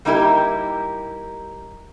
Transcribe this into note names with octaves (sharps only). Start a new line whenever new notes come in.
G3 A#3 D#4 E4 G4 A#4